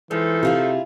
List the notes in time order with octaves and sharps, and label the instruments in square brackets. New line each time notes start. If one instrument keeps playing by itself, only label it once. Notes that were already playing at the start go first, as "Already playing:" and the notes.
[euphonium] E3 [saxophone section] F3 D#4 A4 [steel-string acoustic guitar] G#3
[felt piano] C3 [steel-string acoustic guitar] E4 F4 G#4